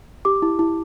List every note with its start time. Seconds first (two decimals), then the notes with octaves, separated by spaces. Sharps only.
0.25 G4 D6
0.42 E4
0.59 E4